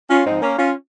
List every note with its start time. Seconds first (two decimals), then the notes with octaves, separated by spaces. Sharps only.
0.09 C#4 F4
0.25 G#2 F3 C4 D#4
0.41 A#3 C#4
0.57 C#4 F4